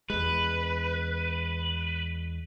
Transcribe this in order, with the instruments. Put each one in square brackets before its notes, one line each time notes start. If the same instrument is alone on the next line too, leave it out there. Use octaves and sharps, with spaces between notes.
[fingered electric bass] E2 G#3 [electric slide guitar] B4